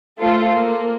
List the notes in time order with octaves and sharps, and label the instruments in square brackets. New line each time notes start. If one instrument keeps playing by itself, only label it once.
[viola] A3 [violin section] F4 A4 C5
[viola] A#3